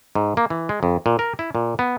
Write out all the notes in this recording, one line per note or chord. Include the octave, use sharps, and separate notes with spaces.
G#2
A#3
E3
G#3
F2
A#2
A#4
E4
A#2
B3